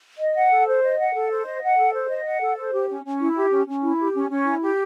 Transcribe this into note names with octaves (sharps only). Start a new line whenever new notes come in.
D#5
F#5
A4
C5
D#5
F#5
A4
C5
D#5
F#5
A4
C5
D#5
F#5
A4
C5
G4
C#4
C#4
E4
G4
C#4
C#4
E4
G4
C#4
C#4
E4
G4